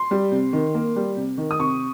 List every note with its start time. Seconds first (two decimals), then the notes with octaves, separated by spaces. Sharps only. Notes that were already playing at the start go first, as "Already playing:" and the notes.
Already playing: C6
0.11 G3
0.32 C3
0.53 D#3
0.74 A#3
0.96 G3
1.17 C3
1.38 D#3
1.51 D#6
1.59 C3 C#6